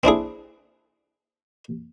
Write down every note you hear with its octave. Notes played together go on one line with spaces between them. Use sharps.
C4 D4 E4 G#4